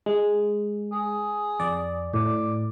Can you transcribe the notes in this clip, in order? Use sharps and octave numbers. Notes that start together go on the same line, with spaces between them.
G#3
G#4
F2 D5
A2 D5